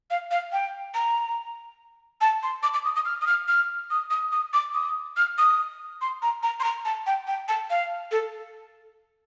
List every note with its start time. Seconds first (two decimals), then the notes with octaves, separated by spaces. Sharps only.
0.10 F5
0.31 F5
0.52 G5
0.94 A#5
2.21 A5
2.43 C6
2.63 D6
2.74 D6
2.85 D#6
2.96 D#6
3.05 F6
3.21 D#6
3.27 F6
3.48 F6
3.90 D#6
4.11 D#6
4.32 D#6
4.54 D6
4.74 D#6
5.17 F6
5.38 D#6
6.01 C6
6.22 A#5
6.43 A#5
6.60 C6
6.64 A#5
6.85 A5
7.06 G5
7.27 G5
7.48 A5
7.70 F5
8.11 A4